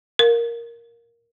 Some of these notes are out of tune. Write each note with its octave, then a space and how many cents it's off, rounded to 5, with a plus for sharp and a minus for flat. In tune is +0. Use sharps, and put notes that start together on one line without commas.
A#4 +0 F5 +20